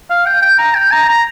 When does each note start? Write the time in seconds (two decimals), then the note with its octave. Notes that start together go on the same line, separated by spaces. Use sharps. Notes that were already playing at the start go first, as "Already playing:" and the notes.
0.10 F5
0.26 G5
0.42 G5
0.58 A#5
0.75 G5
0.92 A#5
1.08 A#5